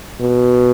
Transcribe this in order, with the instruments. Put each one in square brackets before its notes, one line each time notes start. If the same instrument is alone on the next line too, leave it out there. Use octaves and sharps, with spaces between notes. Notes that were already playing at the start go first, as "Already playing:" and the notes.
[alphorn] B2